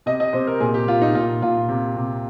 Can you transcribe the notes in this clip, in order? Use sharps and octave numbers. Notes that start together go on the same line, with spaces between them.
C3 D#5
D#5
C3 C5
A#4
A#2 G#4
G4
A#2 F4
D#4
A#2 F4
A#2 F4
C3
C3